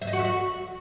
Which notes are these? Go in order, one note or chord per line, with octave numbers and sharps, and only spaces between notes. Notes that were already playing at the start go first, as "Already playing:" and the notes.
E5
D#5
F#4
E5
F#4